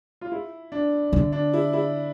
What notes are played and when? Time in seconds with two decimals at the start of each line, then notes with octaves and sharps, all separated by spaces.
0.21 F4
0.32 E4
0.72 D4
1.13 D3
1.32 D4
1.53 E4
1.73 E4